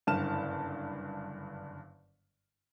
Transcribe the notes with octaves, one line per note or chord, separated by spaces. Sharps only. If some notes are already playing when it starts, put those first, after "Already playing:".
F#1 G2 D3 A5 F6 E7